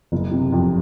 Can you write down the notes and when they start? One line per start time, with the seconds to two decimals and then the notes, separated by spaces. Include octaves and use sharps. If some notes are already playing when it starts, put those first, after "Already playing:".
0.12 F#1
0.31 C3
0.52 F2